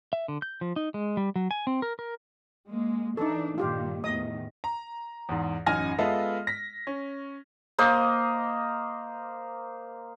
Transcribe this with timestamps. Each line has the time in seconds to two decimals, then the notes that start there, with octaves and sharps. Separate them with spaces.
0.13 E5
0.28 D3
0.42 G6
0.61 F3
0.76 D#4
0.94 G#3
1.17 G3
1.36 F#3
1.51 G#5
1.67 C4
1.82 A#4
1.99 A#4
2.66 G#3 A#3
3.17 E3 D4 D#4 A4
3.58 G2 A#2 D#3 F4 G4 F5
4.04 E2 A2 D#3 D#5 D#6
4.64 A#5
5.29 E2 G#2
5.66 A1 F#2 D#4 G#5 F6 A#6
5.98 G#3 B3 F4 A4 D#5 E5
6.47 A#6 B6
6.87 C#4
7.78 A#3 C5 D#5